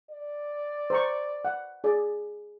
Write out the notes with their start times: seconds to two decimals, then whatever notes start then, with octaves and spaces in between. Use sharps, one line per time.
0.10 D5
0.90 C5 A#5 C#6
1.45 F#5
1.84 G#4 D5